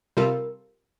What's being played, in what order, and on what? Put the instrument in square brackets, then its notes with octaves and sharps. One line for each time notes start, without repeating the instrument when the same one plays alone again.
[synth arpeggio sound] C3 G3 C4 F4 A4 [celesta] A#4